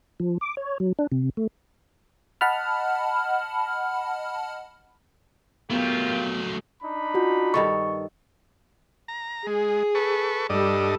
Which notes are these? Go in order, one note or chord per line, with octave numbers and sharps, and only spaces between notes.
F3
D6
C#5
F#3
D4
C3
A3
D#5 F#5 A5 B5 F6
F#3 A3 B3 F4 G4 A#4
D4 D#4 B5
F4 F#4
G2 D#3 A4 C#6
A#5
G#3 G#4
A4 B4 C#6
G2 G3 D4 A4 D#5